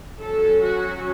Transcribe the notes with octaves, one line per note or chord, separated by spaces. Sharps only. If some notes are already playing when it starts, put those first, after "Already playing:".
F#3 C#4 A4
F#4